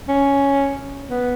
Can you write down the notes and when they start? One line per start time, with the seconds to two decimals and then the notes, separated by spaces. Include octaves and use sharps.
0.08 C#4
1.10 B3